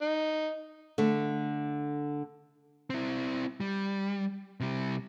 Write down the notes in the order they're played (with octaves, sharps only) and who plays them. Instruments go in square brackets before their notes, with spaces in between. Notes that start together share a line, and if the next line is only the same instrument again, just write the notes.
[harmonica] D#4
[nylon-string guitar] D3 A3
[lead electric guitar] C4 E4
G3
C3 G3